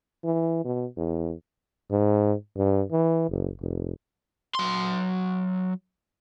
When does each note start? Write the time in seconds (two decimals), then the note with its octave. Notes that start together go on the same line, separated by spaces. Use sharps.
0.24 E3
0.64 B2
0.97 E2
1.91 G#2
2.56 G2
2.92 E3
3.30 F#1
3.61 F1
4.55 F#3 C6